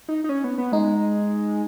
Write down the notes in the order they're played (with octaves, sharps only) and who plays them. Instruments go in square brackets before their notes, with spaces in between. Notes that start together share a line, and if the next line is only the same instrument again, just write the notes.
[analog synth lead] D#4
D#4
C#4
B3
B3
[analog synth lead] G#3 [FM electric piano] D#4